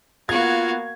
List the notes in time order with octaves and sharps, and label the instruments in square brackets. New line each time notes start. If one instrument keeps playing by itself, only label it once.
[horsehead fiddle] A#3 B3 [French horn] F4 [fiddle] F#4 F5 [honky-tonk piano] G#6